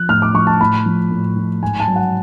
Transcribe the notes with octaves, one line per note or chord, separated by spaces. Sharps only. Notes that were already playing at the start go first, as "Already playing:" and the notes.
Already playing: F3 F#6
A2 F6
D6
F3 C#6
A5
A2 B5
F3
A2
F3
G#2 G#5
A5
F#3
F#5